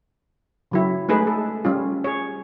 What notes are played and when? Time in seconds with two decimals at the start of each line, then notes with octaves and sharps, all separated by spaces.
0.71 C#3 F#3 E4
1.08 G#3 A3 D#4 G#4 B4
1.27 A4
1.65 G3 C#4 F4
2.04 G#4 C#5